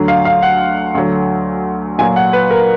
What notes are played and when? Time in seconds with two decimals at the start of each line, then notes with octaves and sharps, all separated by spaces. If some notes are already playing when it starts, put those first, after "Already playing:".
Already playing: D2 D3 F#3
0.08 F5
0.25 F5
0.43 F#5
0.95 D2 D3 F#3
1.98 A#2 F#3 G#5
2.16 F#5
2.33 B4
2.51 A#4